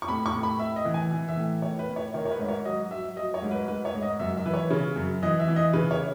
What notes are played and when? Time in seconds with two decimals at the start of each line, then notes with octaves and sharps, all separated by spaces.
0.02 C#6
0.08 A2 B5
0.26 C#6
0.34 A2
0.43 B5
0.59 A2 E5
0.76 D#5
0.85 E3
0.94 G#5
1.11 E3
1.28 E5
1.36 A2
1.62 A2 C#5
1.79 B4
1.88 A2
1.96 C#5
2.14 D#3 C#5
2.25 C#5
2.31 B4
2.39 G#2
2.48 C#5
2.65 F#3 D#5
2.91 F#3 E5
3.16 F#3 D#5
3.34 C#5
3.42 G#2
3.51 B4
3.68 G#2 B4
3.85 C#5
3.94 G#2
4.03 D#5
4.20 F#2 E5
4.37 E5
4.45 E3 B4
4.54 C#5
4.70 C#3
4.96 F#2
5.22 E3 D#5
5.40 E5
5.48 E3
5.56 D#5
5.73 C#3 B4
5.91 C#5